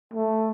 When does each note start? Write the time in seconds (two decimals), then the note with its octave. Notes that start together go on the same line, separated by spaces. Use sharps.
0.14 A3